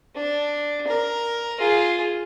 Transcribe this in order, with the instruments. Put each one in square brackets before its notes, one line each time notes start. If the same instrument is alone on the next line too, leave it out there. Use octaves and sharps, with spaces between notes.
[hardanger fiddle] D4
A#4
F4 G#4